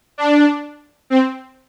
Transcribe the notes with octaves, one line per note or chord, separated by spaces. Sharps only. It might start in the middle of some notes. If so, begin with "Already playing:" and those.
D4
C4